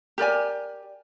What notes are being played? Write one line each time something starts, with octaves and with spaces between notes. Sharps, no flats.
G4 A#4 D5 G#5